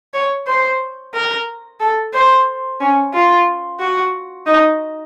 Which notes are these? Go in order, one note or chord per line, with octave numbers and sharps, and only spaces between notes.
C#5
C5
A#4
A4
C5
C#4
F4
F#4
D#4